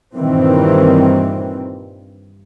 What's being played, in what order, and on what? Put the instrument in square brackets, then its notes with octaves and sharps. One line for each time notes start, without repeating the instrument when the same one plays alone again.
[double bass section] G2 A#2 D#3 E3 C4